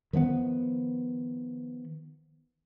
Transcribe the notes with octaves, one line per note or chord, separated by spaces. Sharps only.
D#3 F3 A#3 B3